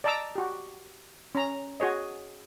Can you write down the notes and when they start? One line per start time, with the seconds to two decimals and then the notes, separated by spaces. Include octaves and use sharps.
0.04 D5 D#5 A5 A#5 D6 E6
0.35 F#4 G4
1.35 C#4 A#5
1.80 F#4 G#4 C#5 D#5